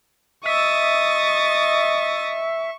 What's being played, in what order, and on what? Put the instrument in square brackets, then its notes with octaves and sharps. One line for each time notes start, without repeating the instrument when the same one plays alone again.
[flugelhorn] D#5 [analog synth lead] E5 [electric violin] C#6 [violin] D#6 A6